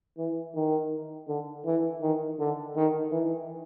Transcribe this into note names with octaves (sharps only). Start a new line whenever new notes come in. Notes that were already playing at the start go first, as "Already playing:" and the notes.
E3
D#3
D3
E3
D#3
D3
D#3
E3